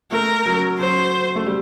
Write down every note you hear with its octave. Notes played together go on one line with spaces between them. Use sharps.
A3 A#4
F#3
F#3 C5
A3
G3